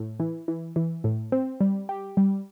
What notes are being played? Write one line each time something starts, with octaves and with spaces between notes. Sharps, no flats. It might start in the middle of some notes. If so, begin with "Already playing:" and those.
Already playing: A2
E3
E3
E3
A2
C4
G3
G4
G3